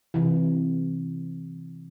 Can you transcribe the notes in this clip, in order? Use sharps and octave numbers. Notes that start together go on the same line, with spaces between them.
C3 E3